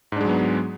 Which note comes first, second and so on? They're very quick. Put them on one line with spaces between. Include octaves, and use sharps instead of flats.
G#2 D4 G#3 F#3 B3